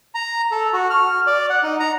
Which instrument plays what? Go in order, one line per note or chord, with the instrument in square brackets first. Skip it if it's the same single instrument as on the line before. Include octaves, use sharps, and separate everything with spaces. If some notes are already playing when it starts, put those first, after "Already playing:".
[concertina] A#5
A4
F#4
F6
D5
F#5
D#4
A#5